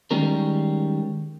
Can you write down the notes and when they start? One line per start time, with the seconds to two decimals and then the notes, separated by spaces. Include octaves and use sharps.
0.11 D#3 F3 G3 G#3 C#4 A#4